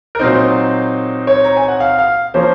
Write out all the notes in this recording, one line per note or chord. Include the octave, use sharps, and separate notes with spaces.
A#4
A#2 F#3 C4 D#4 C5
C#5
A#5
G#5
F#5
F5
F5
F3 A#3 C#4 C5